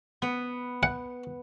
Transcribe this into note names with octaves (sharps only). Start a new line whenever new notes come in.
B3
F#5